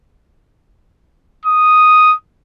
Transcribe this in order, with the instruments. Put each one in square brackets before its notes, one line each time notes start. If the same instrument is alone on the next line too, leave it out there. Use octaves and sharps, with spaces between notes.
[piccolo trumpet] D#6